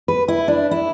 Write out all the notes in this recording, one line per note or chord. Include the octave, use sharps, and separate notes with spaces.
B4
E4
D4
E4